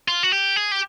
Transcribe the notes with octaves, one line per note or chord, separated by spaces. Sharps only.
F4
F#4
G4
G#4
G4